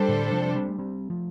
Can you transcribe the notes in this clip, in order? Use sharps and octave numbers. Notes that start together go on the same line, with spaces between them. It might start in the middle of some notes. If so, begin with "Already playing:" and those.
Already playing: G3 D4 A4 C5
A2 D3
C3 F3
G3 C4
A3
G3 C4
F3 A3